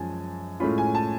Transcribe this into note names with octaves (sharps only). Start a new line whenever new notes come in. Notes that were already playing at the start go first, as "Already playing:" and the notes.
Already playing: F#2 F3 G#3 C#4 F4 G#5 A5
A2 G#3 C#4 F4 B5
G#5
A5